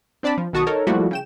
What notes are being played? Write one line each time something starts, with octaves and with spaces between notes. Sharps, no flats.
C4 D4 D5 A5 B5
F3
B1 D#3 F#4 A5 C#6 D#6
D#4 A4 A#4 C#5
F3 G3 A3 A#3 E4 F#4
C#3 G5 E7